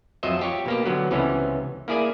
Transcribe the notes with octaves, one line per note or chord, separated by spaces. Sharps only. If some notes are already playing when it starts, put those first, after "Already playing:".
F2 F#3 C5 D#5 E5
F4 G4 C#5
B2 A#3 G4
D3 F#3 B3
C#2 C3 E3 B3 C#4
A#3 E4 G#4 D5 G#5